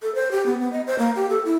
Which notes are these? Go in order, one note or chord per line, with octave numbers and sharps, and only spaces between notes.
A4
C5
G4
B3
B3
D#5
C5
A#3
G4
A4
E4